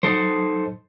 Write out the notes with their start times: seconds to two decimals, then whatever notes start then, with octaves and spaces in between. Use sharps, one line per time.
0.03 F#3 D#4 A4 C5